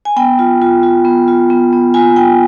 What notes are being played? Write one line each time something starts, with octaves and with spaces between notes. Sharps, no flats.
G#5
B3 G5
F4
F4
F4
B3
F4
B3
B3
F4 G#5
B3 G5